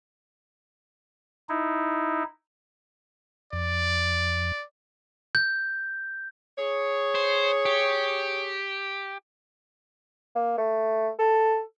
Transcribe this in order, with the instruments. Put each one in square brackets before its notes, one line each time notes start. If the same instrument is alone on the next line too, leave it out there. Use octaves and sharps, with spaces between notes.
[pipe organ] D#4 E4
[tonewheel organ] F2 [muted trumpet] D5
[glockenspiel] G6
[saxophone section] G#4 C#5
[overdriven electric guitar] C5
G4
[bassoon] A#3
A3
A4